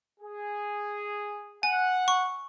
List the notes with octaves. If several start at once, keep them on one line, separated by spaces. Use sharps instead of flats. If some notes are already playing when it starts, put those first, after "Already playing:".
G#4
F#5 G#5
C#6